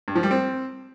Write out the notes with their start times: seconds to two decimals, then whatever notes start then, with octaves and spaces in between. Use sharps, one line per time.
0.08 G2
0.15 F3
0.23 G3
0.31 C4